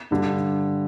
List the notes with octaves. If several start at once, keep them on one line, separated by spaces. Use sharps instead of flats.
G2 D3 G3